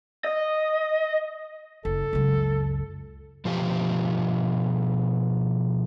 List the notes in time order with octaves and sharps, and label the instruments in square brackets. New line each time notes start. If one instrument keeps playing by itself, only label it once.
[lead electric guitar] D#5
[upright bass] F#1 [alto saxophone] A4
[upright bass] C#2 F#2
[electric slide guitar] B2 F3 F4 G4